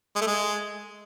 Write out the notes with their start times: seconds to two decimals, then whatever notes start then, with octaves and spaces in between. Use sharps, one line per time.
0.16 G#3
0.21 A3
0.27 G#3